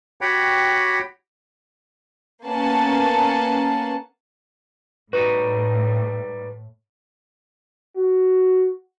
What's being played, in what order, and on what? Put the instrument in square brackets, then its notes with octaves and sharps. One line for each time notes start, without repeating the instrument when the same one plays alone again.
[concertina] F#4 G4 C#5 F#5 G5 B5
[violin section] A#3 B3 C#4 F#5 A5
[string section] A2 [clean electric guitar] G3 D#4 F#4 [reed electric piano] B4
[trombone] F#4